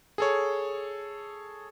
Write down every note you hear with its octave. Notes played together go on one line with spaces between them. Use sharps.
G#4 A4 C#5